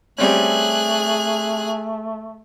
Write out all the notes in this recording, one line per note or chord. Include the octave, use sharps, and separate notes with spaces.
G3 A3 C4 C#4 G#4 F#6